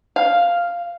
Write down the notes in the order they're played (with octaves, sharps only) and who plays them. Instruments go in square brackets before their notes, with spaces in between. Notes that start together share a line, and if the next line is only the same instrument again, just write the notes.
[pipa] F5